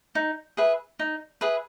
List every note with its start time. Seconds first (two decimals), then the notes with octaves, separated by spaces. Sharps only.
0.15 D#4
0.57 G#4 B4 E5
0.99 D#4
1.41 G#4 B4 E5